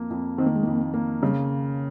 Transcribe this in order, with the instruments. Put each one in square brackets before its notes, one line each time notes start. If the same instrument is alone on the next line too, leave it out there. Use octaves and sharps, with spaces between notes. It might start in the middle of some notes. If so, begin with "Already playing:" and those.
Already playing: [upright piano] F2 A#3
F2
[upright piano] D#3 [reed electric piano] C4
[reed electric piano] A#3
G#3
[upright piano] F2 [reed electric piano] A#3
[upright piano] A#3
[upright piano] C#3 [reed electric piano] G3